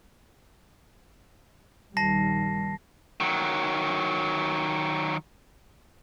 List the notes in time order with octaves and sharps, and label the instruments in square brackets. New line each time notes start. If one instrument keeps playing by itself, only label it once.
[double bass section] A#1 D#3 G3 [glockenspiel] A5 A#6 C7
[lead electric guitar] D#3 F#3